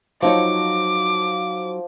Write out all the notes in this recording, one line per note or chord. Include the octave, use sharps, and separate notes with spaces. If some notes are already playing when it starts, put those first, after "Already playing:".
F3 F#3 D#4 C#5 D6